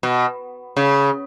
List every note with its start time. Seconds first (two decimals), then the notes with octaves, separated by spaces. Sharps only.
0.03 B2
0.77 C#3